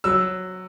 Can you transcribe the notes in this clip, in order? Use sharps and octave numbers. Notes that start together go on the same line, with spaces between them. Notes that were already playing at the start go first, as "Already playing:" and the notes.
F#3 E6